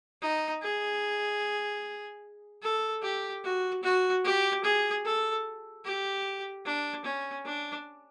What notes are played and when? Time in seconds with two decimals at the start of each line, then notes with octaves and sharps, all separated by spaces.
0.22 D#4
0.62 G#4
2.63 A4
3.03 G4
3.44 F#4
3.83 F#4
4.24 G4
4.64 G#4
5.05 A4
5.85 G4
6.66 D4
7.05 C#4
7.45 D4